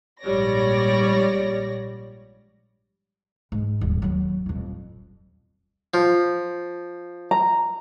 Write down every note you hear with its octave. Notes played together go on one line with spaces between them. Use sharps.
A#1 G#2 G3 C#5 D5 A#6
G#2
D#1
D#2 F#3
D#1 F2
F3
A#5